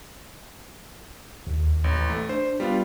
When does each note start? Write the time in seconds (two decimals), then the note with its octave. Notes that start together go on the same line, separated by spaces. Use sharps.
1.47 D#2
1.84 A1
2.10 A3
2.29 D4 C5
2.60 G3 B3 F4